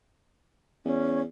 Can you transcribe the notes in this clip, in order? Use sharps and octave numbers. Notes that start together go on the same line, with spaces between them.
E2 C#4